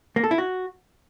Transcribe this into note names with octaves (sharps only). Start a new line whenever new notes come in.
A#3
A4
E4
F#4